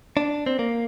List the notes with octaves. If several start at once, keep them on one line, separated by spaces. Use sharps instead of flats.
D4
C4
A#3